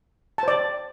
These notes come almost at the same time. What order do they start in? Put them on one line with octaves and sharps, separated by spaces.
A5 C5 D5